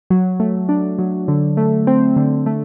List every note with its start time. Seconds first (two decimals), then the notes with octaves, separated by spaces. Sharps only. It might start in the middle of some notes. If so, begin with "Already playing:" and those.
0.10 F#3
0.40 A3
0.69 D4
0.99 F#3
1.28 D3
1.57 A3
1.87 C4
2.16 D3
2.46 A3